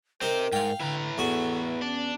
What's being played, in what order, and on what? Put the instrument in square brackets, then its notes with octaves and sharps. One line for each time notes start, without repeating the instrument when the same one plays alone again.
[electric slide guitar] C4 G4 [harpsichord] D#4 C5 [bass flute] A#4
[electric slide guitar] G#2 [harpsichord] F5 G5
[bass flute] D3 [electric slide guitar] E4 B4 A#5
[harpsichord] E2 F#4 [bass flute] A4
[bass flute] C#4 [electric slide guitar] D4